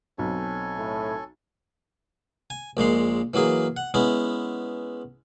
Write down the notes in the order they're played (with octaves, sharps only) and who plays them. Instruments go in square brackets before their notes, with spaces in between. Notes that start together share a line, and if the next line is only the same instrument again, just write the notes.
[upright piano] B1 F#3 C4 [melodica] A4 C#5 G#5
[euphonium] A2
[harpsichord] G#5
A#1 A#2 G#3 C6
E3 F#3 A#3 G#4
F#5
G#3 B3 C#4 E4